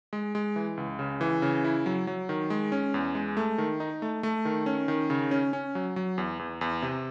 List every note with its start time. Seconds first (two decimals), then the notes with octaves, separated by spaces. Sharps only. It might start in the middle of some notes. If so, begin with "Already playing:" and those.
0.13 G#3
0.35 G#3
0.56 E3
0.77 C#2
0.99 C#3
1.21 E3
1.42 C#3
1.64 E4
1.86 F#3
2.07 F#3
2.29 D#3
2.50 G#3
2.72 C#4
2.94 E2
3.15 G#3
3.37 A3
3.58 D#3
3.80 D#4
4.02 A3
4.23 A3
4.45 D#3
4.66 C#4
4.88 D#3
5.10 C#3
5.31 C#4
5.53 C#4
5.75 F#3
5.96 F#3
6.18 E2
6.39 E2
6.61 E2
6.82 C3